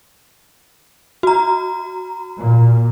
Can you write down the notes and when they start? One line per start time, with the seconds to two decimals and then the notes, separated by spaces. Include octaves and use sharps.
1.23 F#4 A#5
2.38 A#2